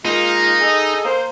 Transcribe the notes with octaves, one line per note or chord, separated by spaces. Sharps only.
G#3 A#3 D#4 F4
G#4 A4 D#5
A#3 C5